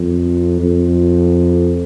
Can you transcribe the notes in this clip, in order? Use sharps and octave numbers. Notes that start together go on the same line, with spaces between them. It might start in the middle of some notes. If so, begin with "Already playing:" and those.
Already playing: F2
F2